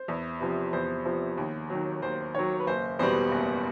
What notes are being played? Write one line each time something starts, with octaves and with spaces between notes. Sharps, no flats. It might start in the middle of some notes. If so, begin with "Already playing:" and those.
Already playing: C5
E2
C3 F3
E2 C5
C3 F3
D#2
D#3 F#3
D#2 C5
D#3 F#3 C#5
B4
F#1 C5
E2 B2 G3 C5
F#1